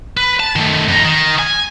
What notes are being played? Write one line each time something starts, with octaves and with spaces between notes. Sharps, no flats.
B4
A5
D#3 A3
F2 D#4
D#3
G#5